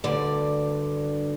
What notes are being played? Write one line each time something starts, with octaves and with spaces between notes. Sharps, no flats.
D2 G2 D3 D5